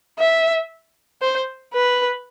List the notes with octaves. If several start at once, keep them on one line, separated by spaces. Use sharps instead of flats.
E5
C5
B4